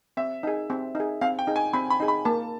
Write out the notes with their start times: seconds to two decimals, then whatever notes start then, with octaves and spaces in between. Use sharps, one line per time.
0.17 C4 E5
0.43 D#4 G#4
0.70 C4
0.95 D#4 G#4
1.21 C4 F5
1.39 G5
1.47 D#4 G#4
1.56 G#5
1.73 C4 B5
1.90 B5
2.00 D#4 G#4
2.08 B5
2.25 A#3 A5